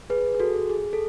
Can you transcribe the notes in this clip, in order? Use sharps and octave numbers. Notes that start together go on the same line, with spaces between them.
G#4 B4
G#4
F#4 A4
G#4
A4